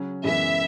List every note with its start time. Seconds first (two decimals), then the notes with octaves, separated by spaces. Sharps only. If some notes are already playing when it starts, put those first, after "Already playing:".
Already playing: C#3 F#3 C#4
0.24 F#2 C#3 E3 G#3 B3 E5